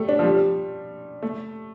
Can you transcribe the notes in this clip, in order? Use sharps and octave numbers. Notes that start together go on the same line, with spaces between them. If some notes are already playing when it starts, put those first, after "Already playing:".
Already playing: G3 A3
D4
F3
G3
A3